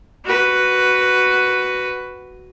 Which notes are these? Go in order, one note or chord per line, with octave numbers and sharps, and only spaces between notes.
F#4 B4